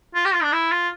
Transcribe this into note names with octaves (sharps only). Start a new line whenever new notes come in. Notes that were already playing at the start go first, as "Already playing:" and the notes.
F4
G4
F4
D4
E4
F4